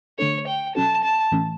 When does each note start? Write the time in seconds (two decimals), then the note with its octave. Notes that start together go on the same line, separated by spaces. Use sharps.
0.18 D3 A3 D4 A4 C#5
0.47 G5
0.75 B2 F#3 C#4 F#4 A4 A5
1.04 A5
1.32 A2 E3 A3 C#4